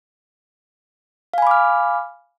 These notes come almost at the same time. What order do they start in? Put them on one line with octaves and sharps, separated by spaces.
F5 G#5 B5 D6 F6